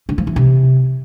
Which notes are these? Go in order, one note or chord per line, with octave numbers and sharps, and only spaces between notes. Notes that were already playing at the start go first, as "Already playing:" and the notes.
D3
F3
E3
C3